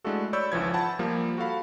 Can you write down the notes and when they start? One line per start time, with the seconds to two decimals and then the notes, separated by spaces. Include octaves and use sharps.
0.04 G#3 A3 D4 E4 F#4 A4
0.33 C#5 D5 B5 C#6 E6 G6
0.52 G#1 C#2 E3 F3 G#6
0.74 F#5 A5 B5
0.99 F3 G3 A#3
1.38 F#4 A4 F5 B5